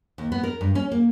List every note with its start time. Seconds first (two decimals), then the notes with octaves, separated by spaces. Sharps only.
0.18 D#2
0.32 B3
0.43 A#4
0.61 G2
0.75 C#4
0.92 A#3